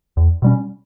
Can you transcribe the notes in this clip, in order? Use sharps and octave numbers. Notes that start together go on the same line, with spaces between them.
E2
B2 G3 C#4